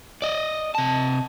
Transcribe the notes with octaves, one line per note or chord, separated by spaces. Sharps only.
D5 D#5
C3 A5